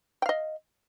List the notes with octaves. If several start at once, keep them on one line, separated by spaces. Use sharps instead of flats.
D#5 F5 G5